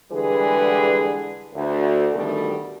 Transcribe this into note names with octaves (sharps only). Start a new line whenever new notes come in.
D3 E3 G3 G#3 G#4 B4
D2
G2 B2 D3 D#3 G3 A3